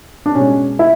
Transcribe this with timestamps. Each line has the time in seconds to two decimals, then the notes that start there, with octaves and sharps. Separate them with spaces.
0.26 D4
0.35 B2 G#3 C#4
0.79 E4